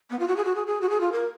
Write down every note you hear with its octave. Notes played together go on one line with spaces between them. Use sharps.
B3
F4
F#4
G#4
F#4
G#4
G#4
F#4
G#4
F4
A#4